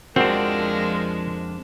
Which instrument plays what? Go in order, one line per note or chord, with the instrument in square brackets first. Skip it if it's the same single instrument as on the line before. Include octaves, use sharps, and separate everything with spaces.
[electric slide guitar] F2 D4 [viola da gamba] F3 G#3 [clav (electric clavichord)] C4 F#4 [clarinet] A#4